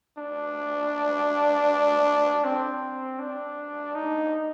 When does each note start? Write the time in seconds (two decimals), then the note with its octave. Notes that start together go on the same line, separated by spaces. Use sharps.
0.18 D4
2.45 C4
3.20 D4
3.95 D#4